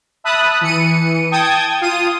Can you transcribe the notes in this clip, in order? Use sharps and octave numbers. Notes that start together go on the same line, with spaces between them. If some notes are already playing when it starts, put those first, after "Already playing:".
E5 A5 B5 D#6 F#6
E3 C#7 D#7
G5 A5 D#6 G#6
F4 D#6 D#7